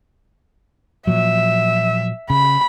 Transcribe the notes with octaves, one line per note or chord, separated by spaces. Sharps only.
A#2 F3 F#3 E5
C#3 B5